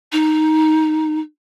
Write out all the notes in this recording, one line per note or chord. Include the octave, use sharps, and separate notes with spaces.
D#4